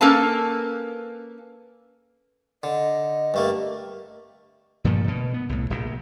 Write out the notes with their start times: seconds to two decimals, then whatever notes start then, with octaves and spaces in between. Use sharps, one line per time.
0.01 A#3 C#4 A4 B4 F5 A5
2.63 D3 D#5
3.34 G2 A3 A#3
4.84 G2 A#2 F3 A3
5.08 B2
5.34 B3
5.49 C2 A2
5.70 D#1 A#1